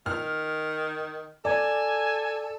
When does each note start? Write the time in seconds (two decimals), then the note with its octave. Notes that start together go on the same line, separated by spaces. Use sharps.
0.06 D#3 F6
1.45 A4 D5 G#5